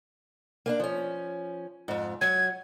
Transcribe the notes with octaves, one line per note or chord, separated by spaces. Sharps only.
A#3 C4 D4
F3 C#4
F2 G#2
F#3 G#6